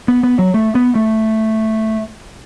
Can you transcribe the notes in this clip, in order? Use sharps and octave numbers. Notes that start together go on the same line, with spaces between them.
B3
B3
F#3
A3
B3
A3